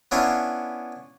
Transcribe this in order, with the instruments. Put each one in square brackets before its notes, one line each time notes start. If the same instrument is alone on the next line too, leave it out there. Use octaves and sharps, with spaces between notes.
[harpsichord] B3 C#4 D4 E4 F5 C6